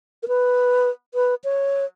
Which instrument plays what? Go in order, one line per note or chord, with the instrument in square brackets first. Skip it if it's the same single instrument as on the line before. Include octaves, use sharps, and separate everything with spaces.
[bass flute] A#4
B4
B4
C#5